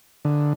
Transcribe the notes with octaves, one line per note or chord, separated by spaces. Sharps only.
D3